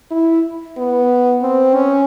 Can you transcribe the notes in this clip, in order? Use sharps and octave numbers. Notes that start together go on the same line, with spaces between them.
E4
B3
C4
C#4